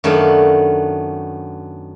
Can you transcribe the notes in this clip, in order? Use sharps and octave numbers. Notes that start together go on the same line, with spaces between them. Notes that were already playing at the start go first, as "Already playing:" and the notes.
F#2 D#3 A3 B3 D4 F5